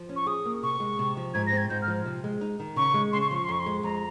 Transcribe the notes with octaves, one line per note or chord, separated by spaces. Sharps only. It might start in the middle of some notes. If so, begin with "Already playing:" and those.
Already playing: F3
C#4
C#6
G#4 D#6
A#3
C3 C#6
G#3
C3
F3
G#2 G#6
A#6
C4
G#6
G#2 G6
F6
F3
C3
G#3
D#4
D#3
C#3 C#6
G#3
C#3 C6
C#6
C6
F3 C#6
C6
F2 C#6
C6
G#3
F2 A#5